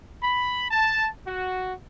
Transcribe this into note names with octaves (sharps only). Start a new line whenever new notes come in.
B5
A5
F#4